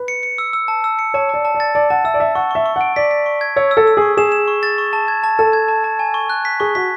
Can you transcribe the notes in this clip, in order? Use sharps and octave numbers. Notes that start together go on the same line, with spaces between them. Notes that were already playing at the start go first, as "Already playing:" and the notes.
Already playing: B4
C#7
C#7
E6
E6
A5
E6
C#7
C#5 A5
D5 A5
A5
D5
A6
D5 A5
F#5 A5
E5 E6
D5
E5 A5
F#5 C#6
E5 C#6
C#6
F#5 D7
D5 B6
B6
C#6
G#6
C#5 E6
E6
A4
E6
G#4 C#6
G#4 E7
E7
C#6
A6
C#6
A5
G#6
A5
A4 A5
G#6
A5
A5
G#5
C#6
F#6
B6
G#4 C#6
F#4 B6